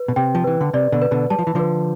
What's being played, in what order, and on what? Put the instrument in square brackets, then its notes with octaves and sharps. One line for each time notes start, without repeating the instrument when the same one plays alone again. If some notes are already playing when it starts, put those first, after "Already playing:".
Already playing: [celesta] B4
[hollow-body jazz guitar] B2
[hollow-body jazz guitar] C3 [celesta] G5
[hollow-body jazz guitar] F3
[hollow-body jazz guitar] E3 [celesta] B4
[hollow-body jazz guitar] D3
[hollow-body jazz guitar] C3 [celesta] D5
[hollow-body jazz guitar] B2 D3
[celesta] B4
[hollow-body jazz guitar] B2 D3
[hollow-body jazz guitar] G3 [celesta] A5
[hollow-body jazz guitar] F3
E3
[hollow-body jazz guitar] D3 F3 [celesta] B4